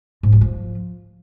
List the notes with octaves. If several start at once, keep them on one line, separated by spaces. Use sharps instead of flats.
G#2
F#3
F3